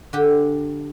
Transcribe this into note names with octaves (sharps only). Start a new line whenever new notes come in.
D3 G4